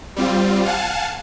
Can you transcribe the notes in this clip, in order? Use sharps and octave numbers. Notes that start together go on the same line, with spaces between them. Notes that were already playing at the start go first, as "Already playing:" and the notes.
G3 C4 F4
F5 F#5 G#5 A5